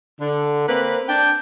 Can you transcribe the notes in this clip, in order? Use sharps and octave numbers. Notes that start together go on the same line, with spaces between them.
D3
A#3 C4 B4
D4 G5